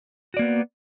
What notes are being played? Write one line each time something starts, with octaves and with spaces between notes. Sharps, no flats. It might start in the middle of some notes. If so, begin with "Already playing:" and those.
A#3 B3 F#4 D5